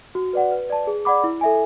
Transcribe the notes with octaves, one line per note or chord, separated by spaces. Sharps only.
F#4
B4 D5 F#5
B4
D5 A5
G#4
D5 F#5 B5 D6
E4
A4 E5 G#5